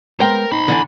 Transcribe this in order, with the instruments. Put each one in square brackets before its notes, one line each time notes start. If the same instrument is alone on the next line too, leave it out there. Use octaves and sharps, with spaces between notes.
[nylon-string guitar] G#3 B3 [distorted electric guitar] A#4 [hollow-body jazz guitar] C5 G5
[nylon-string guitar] D#4 [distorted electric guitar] B5 C6
[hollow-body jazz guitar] D3 E3 D4